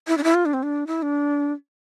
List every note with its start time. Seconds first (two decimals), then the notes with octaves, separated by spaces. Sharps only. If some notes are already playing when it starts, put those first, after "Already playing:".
0.08 E4
0.18 D4
0.24 E4
0.34 F4
0.46 D4
0.53 C4
0.63 D4
0.87 E4
1.02 D4